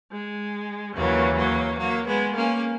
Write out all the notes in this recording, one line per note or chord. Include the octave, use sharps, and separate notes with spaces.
G#3
D#2 C#3 E3 F#3 A#3
F#3 A#3
F#3 A#3
G#3 B3
A#3 C#4